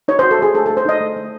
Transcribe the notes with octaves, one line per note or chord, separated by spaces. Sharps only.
D#4 C#5
C5
F#4
A4
G#3 G#4
A3 A4
A4
A3
C5
D#4 D#5
A3
A3